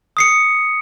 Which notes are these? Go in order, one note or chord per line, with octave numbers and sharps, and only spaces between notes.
D#6 C7 C#7